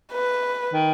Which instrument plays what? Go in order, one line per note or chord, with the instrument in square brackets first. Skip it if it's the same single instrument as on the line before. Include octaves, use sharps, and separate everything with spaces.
[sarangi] B4
[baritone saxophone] D#3